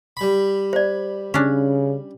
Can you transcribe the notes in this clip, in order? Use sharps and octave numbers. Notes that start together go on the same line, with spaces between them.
G3 B5
C5 D5
C#3 C#4 D4